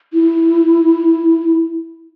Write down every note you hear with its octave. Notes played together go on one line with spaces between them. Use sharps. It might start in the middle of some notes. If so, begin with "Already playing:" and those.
E4